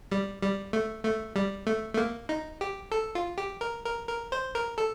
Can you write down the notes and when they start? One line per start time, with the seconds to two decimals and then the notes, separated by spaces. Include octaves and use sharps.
0.12 G3
0.43 G3
0.73 A3
1.05 A3
1.36 G3
1.67 A3
1.94 A3
1.98 A#3
2.29 D#4
2.61 G4
2.92 A4
3.15 F4
3.38 G4
3.61 A#4
3.85 A#4
4.08 A#4
4.32 C5
4.55 A#4
4.78 A4